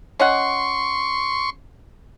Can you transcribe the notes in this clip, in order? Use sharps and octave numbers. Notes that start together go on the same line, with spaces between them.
C#4 D#5 F#5 C6 C#6